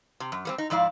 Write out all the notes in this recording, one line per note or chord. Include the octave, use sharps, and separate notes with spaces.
C3
F#2
G3 A#3 C4
D#4
G#2 F3 E4 D5 F5